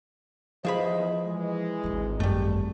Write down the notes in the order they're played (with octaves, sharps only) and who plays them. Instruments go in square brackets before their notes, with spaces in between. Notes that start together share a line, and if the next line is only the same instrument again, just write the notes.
[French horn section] E2 C5 D#5 [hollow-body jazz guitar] F3 G#4 B5
[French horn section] E3 G#3
[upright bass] G#1 D2
[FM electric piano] F#2 [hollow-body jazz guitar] G3 A3